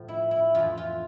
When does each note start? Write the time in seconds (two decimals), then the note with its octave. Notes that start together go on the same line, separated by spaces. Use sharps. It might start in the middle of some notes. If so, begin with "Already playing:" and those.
Already playing: A2 F3
0.08 E4
0.31 E4
0.55 F2 E3 F4
0.77 F4